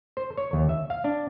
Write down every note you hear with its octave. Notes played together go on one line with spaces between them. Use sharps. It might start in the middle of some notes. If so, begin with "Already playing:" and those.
C5
C#5
D#2
E5
F5
D4